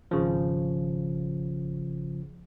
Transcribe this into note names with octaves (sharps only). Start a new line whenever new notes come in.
G#1 C#3 F3